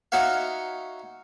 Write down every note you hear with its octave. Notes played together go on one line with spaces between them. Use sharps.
D#4 F#4 C#5 E5 F5